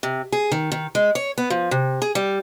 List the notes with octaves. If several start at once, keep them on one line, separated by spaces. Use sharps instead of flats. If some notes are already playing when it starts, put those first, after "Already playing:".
C3
G#4
D#3
D#3
G#3
C#5
B3
F3
C3
G#4
G3